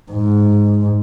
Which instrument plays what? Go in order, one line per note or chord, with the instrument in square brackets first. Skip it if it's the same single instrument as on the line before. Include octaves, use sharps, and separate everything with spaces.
[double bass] G#2